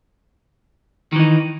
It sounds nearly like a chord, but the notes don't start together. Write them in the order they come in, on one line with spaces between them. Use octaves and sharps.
D#3 E3 D#4